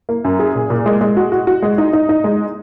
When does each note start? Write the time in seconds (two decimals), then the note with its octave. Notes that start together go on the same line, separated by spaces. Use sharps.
0.09 A#3
0.24 F#2
0.39 G#4
0.55 A#2
0.70 A#2
0.86 G#3
1.01 G#3
1.17 F#4
1.32 F#4
1.47 F#4
1.63 G#3
1.78 D#4
1.93 D#4
2.09 D#4
2.24 G#3